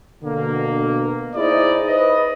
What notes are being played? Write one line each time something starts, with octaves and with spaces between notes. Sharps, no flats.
B2 D3 A#3
D#4 E4 G#4 C5 D5 D#5
B4 C5 D#5